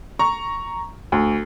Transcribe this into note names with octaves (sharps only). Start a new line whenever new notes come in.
A#5 C#6
D2